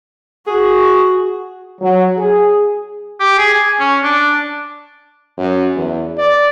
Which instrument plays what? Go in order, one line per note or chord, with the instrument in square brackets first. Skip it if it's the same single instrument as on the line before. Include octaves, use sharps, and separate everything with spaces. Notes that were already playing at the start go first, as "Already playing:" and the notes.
[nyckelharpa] F#4 [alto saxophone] G#4
[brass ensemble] F#3
G#4
[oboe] G4
G#4
G#5
C#4
D4
[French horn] F#2
E2
D5